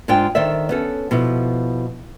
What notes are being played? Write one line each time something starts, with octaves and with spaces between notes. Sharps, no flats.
G#2 D4 F4 G5 G#5
D#3 A4 C5 D5 E5
B3 C#4 A4
B2 F3 E4